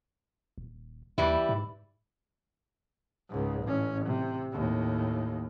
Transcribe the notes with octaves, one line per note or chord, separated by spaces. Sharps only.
D#1
D#2 E3 G3 E4
G#2
C#2 G#2
A1 C#4
C3
D#2 A2